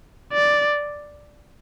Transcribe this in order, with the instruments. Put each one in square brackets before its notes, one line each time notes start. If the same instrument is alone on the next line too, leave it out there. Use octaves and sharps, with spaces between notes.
[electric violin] D5